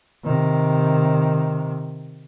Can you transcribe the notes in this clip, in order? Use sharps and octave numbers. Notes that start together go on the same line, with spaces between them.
C3 D#3